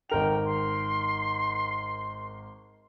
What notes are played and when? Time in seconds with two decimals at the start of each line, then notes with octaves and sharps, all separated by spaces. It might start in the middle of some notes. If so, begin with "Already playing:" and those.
0.10 G#1 A#4 G5 F7
0.45 C6